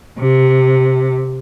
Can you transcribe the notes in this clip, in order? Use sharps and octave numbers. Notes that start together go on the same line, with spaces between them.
C3